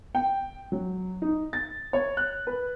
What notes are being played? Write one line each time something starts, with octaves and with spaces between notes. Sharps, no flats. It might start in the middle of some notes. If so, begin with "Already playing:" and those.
G5
F#3
D#4
A6
C#5
F#6
B4